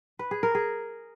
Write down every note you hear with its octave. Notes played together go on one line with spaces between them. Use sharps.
B4
G#4
A#4
G#4